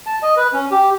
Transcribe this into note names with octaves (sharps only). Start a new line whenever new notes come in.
A5
D#5
B4
C#4
G4